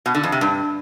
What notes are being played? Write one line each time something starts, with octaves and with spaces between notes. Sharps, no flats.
B2
D3
F2
C3
G2